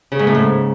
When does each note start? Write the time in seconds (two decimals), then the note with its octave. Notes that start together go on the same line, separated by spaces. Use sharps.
0.12 C#3
0.19 G#2
0.27 A2
0.35 G#2